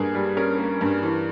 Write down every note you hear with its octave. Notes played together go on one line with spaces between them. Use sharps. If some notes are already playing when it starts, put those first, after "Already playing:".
Already playing: G2 A#3 G#4
G3
C#4 A#4
A#3
G2
E3